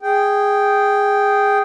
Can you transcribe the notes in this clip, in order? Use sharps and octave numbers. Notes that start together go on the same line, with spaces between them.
G#4 G5